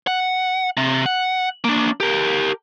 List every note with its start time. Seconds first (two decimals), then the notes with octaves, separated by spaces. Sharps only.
0.07 F#5
0.77 C3
1.06 F#5
1.64 A#3 D4
2.00 G4 A#4